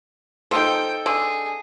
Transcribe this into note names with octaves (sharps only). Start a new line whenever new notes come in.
F3 D#4 A4 G5
D3 G#4